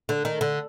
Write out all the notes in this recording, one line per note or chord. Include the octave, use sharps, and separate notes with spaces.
D3
D#3
D3